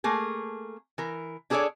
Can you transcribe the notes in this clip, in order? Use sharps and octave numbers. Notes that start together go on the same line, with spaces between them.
A3 A#3 G#4
E3 A#4
D4 G#4 A4 B4 C#5 D5